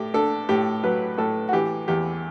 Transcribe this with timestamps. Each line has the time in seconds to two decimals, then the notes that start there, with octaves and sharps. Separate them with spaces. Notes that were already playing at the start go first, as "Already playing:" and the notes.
Already playing: A2 A3 G4
0.14 D4 A4
0.49 A2 G4
0.83 F#3 B4
1.18 A2 A4
1.49 F#4
1.53 E3 G4
1.88 E2 G4